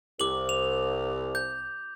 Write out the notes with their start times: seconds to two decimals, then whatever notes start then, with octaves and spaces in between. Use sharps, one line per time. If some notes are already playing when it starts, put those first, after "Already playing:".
0.20 C2 D6 F#7
0.49 F7
1.35 G6